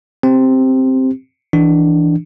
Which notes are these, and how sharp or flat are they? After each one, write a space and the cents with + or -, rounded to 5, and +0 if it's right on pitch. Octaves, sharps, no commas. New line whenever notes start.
C4 +0 G4 +0
E3 +0 D4 +0